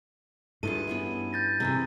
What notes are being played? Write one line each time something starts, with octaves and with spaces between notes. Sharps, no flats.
G2 E4 F4 G#4 A4 D#7
E3 B3 C#4
G6 A6 A#6
C3 E3 C4 G#4